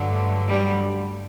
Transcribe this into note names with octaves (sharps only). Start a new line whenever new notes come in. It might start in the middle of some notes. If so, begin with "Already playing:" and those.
Already playing: G2 D3 F#3
A3
G3